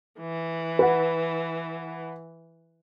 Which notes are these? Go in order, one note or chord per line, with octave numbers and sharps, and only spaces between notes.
E3
B4 F#5